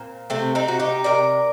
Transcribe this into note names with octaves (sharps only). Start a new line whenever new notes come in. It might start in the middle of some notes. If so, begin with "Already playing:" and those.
Already playing: A#2 C4
C3 A3 C4
C4 D#4
C3 F#4
D#4 G4
C3 A#4 D5